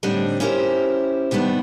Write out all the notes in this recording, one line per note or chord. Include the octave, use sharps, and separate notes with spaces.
A2 D3 G3 C4 D4 D#4
C#4 E4 G4 A#4 C5
C3 D#3 G3 B3 D4